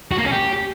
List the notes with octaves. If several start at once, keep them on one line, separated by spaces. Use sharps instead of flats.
F#4
A#3
C#4
G4